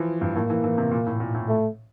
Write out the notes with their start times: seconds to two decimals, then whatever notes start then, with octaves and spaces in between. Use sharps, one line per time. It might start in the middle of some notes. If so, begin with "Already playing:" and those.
Already playing: E3 F3
0.21 G2
0.35 A2 A#3
0.50 E3
0.64 E3
0.78 C3
0.91 A#2
1.06 A2
1.20 A#2
1.34 A2
1.49 A3